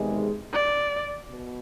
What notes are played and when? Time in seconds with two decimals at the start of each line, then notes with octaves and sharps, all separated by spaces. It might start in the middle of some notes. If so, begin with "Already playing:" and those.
Already playing: E2 C3 D#3 G#3
0.53 D5
1.30 B2